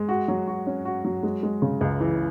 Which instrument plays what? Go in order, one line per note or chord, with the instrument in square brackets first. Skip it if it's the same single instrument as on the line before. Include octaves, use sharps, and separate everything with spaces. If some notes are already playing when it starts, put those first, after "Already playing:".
Already playing: [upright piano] G#3
F#4
F#3
F#4
C#4
F#4
F#3
G#3
G#3
C#3
C#2
E3